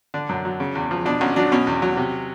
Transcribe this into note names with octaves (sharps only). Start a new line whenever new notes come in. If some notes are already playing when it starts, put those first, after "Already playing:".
D3 D4
F#2
F#3
C#3
E2
F3
B2 D4
B1 C#4
F#3 D4
B2 C#4
E2
F#3
C3